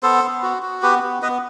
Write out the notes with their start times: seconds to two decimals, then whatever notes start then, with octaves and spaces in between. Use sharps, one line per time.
0.03 B3 A4 C5
0.23 B3
0.42 F#4
0.62 F#4
0.82 B3 G4 B4
1.03 B3
1.22 B3 B4 D#5